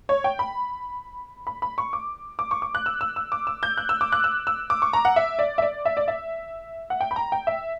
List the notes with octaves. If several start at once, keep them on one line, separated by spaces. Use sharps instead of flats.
C#5
G5
B5
B5
B5
C#6
D6
D6
C#6
D6
F#6
E6
E6
E6
D6
E6
G6
F#6
E6
D6
F#6
E6
E6
D6
C#6
A#5
F#5
E5
D5
E5
D5
E5
D5
E5
F#5
G5
B5
A#5
G5
E5